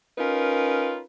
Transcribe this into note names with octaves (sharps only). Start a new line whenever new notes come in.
C#4 D#4 F4 A#4 B4